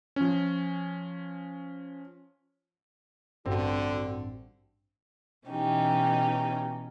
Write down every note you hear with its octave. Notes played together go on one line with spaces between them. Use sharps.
F3 C#4
A1 G2 D3 C4 F#4
B2 E3 C#4 D#4 G4